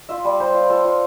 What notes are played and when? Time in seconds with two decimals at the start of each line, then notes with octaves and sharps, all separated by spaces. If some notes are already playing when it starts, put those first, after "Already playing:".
0.09 F4 E5
0.24 G3 D5
0.40 G3 C5
0.54 F4
0.70 F4 A4
0.85 F4